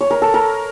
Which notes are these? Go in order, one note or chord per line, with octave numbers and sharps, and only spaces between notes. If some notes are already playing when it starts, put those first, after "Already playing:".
C#5
A#4
A4
A#4